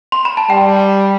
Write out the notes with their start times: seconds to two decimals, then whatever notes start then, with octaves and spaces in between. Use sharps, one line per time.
0.12 C6
0.25 B5
0.37 A5
0.50 G3 G5